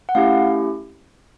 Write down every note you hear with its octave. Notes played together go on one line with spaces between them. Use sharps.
F#5
A3 C#4 E4 G4 F5